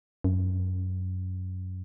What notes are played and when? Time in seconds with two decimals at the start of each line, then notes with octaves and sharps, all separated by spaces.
0.24 F#2